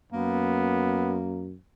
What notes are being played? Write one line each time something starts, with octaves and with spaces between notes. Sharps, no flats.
F#2 A#3 B3